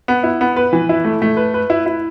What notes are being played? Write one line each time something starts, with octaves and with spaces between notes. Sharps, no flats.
B3
E4
B3
B4
E3
E4
A3
A3
B4
B4
E4
E4